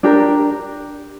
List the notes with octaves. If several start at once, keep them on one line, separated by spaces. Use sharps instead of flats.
D4 G4 A#4